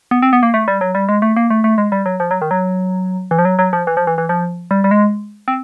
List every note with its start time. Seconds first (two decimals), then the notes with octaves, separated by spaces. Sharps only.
0.11 B3
0.22 C4
0.33 B3
0.43 A#3
0.54 A3
0.68 G3
0.81 F#3
0.95 G3
1.09 G#3
1.22 A3
1.36 A#3
1.50 A3
1.64 A3
1.78 G#3
1.92 G3
2.06 F#3
2.20 F3
2.31 F#3
2.42 D#3
2.51 F#3
3.31 E3
3.39 F3
3.45 F#3
3.59 F#3
3.73 F3
3.87 E3
3.97 F3
4.07 E3
4.18 E3
4.29 F3
4.71 G3
4.84 G3
4.91 G#3
5.48 C4